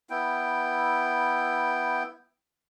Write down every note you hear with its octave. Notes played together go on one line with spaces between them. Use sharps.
B3 E4 G5